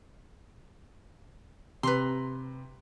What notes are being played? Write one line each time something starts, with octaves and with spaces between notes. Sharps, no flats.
C3 B4 A#5 C6